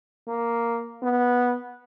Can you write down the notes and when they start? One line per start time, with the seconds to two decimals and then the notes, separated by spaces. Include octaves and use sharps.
0.28 A#3
1.03 B3